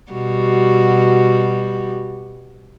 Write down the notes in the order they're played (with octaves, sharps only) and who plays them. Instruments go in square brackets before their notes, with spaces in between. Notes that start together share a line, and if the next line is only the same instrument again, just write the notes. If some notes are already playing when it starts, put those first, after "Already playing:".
[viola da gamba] B2 G3 F#4